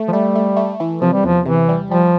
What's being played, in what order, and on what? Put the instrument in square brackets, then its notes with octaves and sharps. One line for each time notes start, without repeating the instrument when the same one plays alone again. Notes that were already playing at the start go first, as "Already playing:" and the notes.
Already playing: [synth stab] A3
[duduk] F3
[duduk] G3 [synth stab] A3
[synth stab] A3
A3
E3
[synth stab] C3 [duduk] F3
[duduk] G3
[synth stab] E2 [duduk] F3
[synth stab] C3 [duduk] E3
[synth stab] G3
[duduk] F3 [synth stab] G3